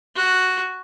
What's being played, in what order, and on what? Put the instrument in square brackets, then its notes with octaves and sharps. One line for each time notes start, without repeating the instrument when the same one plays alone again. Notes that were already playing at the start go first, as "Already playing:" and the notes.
[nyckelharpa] F#4